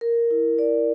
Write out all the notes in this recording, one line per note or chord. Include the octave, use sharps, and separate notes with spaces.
A#4
E4
D5